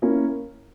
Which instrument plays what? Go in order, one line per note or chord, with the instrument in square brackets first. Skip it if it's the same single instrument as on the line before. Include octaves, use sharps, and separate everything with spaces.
[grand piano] A#3 C#4 E4